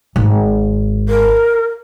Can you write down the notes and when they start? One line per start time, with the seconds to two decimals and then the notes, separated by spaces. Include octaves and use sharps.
0.16 G#1
1.09 A#4